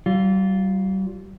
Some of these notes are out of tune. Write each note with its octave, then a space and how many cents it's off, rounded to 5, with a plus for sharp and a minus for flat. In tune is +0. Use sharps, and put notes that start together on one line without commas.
G3 -40 F4 +0